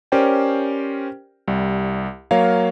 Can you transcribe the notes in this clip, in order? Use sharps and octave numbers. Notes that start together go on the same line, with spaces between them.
C#4 G4 A#4 C5 D5 G5
C2 G3
F#3 A#3 A#4 C#5 F5